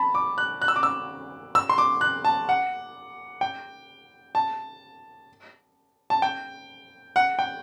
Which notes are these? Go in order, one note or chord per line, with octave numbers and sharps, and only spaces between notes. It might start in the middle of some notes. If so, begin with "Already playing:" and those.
Already playing: A5 B5
D6
F#6
F#6
E6
D6
E6
E6
C6
D6
F#6
A5
F#5
G5
A5
A5
G5
F#5
G5